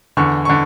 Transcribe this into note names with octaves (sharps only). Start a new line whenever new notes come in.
E2 D3 C#6
D3 C#6